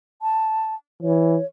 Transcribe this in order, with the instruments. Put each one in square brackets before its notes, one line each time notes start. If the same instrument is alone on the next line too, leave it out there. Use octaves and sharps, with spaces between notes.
[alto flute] A5
[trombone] E3 [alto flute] C#5